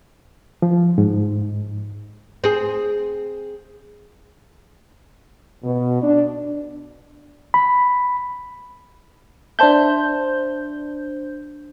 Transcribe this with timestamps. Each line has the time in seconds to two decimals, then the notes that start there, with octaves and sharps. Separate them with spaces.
0.62 F3
0.98 G#2
2.44 C4 G#4
5.64 B2
6.03 D4
7.54 B5
9.59 D4 C5 E5 A5 G6